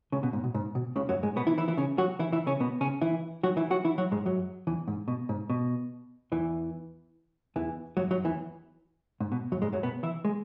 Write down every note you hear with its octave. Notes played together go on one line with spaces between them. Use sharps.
C#2 C#3
B2
G#2
B2
G#2
B2
C#2 C#3
F#2 F#3
G#2 G#3
B2 B3
E3 E4
E3 E4
E3 E4
C#3 C#4
F#3 F#4
E3 E4
E3 E4
C#3 C#4
B2 B3
C#3 C#4
E3 E4
F#3 F#4
E3 E4
F#3 F#4
E3 E4
F#3 F#4
G#2 G#3
F#2 F#3
E2 E3
G#2
B2
G#2
B2
E2 E3
E2 E3
F#2 F#3
F#2 F#3
E2 E3
G#2
B2
F#2 F#3
G#2 G#3
F#2 F#3
B2 B3
E3 E4
G#3